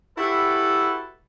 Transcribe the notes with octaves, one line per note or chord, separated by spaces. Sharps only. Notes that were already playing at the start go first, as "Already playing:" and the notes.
E4 F#4 G4 A4 B4